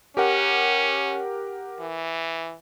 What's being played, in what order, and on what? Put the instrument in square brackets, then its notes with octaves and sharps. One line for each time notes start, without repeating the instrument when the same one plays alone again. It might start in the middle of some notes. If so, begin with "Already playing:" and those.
[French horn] C#4 [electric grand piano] G4 A#4 F#5
[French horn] E3